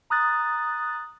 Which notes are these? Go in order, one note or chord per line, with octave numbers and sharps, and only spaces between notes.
A#5 D#6 F#6 A6